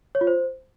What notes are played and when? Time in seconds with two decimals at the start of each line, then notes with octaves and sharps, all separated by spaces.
0.15 C#5
0.21 F4
0.27 C5